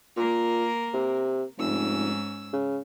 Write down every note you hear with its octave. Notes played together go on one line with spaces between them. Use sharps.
A#2 A#3 A#4
C3
F1 G#2 C#4 E6
C#3